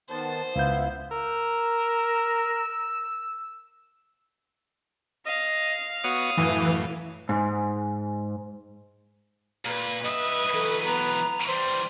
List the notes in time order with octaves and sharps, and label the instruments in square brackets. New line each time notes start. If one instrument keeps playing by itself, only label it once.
[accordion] D#3 B3 A5 [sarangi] C5
[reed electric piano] C#2 G6 [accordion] B3 E4 [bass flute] F5
[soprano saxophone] A#4 [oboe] E6
[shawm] D#5 [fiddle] F5
[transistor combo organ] B3 F#4 C#5 [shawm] D#6
[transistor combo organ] F#2 A2 [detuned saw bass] E3
[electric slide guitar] G#2
[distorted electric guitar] A#2 [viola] B4
[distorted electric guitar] G2 E5 [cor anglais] D#5
[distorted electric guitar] E3 F#3 [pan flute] A4
[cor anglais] B3 [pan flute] A#5
[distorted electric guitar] E3 G3 [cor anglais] C5